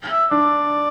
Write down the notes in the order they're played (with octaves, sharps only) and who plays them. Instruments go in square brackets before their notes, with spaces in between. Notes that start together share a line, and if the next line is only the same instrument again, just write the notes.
[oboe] E5
[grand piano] D4 [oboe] D5